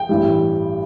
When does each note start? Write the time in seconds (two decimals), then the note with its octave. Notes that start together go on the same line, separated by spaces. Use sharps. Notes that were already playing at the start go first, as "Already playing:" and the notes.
Already playing: G5
0.09 A1 G2 E3 G3